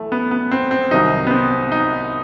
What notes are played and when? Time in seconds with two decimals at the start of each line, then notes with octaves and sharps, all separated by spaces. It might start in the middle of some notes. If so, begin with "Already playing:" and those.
Already playing: B1 E3 A3
0.12 B3
0.31 B3
0.51 C4
0.71 C4
0.91 C2 C3 D#3 F#3 D#4
1.27 B3
1.31 C4
1.72 D#4